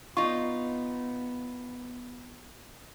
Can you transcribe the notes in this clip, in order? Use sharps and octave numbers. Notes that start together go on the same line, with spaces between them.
B3 D#4 F4 C#6